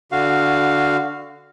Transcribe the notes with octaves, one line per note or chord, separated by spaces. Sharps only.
D3 F#4 F5